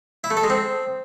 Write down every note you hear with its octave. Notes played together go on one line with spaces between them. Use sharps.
E4
A3
A4
G#3
C4